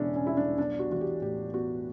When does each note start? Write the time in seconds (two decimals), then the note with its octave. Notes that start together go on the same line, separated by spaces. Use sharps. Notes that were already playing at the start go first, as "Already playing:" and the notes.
Already playing: E1 E2 C#3 C#4 D4 E4
0.15 C#4
0.26 G3 E4
0.37 D4
0.58 B1 D4
0.79 F#4
0.90 E3 F#4
1.01 G4
1.22 A2 G4
1.53 B3 F#4